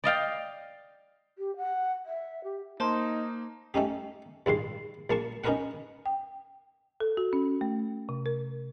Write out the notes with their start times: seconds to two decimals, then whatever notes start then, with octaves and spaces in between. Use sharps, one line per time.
0.04 D5 D#5 F5 G5
1.38 G4
1.57 F#5
2.06 E5
2.44 G4
2.80 A#3 D#4 C5 A5 C6
3.74 A3 C#4 D#4 G4
4.46 A#1 D#2 G#2 C6
5.10 A#1 A#3 A5 C#6
5.44 C#4 D#4 F#4 A#4 B4 F#5
6.06 G5
7.00 A4
7.17 F#4
7.33 C#4
7.61 A3
8.09 C3
8.26 A#4